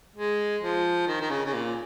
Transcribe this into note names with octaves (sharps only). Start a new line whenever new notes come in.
G#3
F3
D#3
D#3
C#3
C#3
A#2